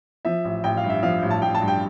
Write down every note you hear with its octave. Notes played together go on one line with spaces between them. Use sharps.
F3 E5
A1
A1 G5
F5
G2
E5
F3 F5
A1
A5
A1 G5
A5
G2
G5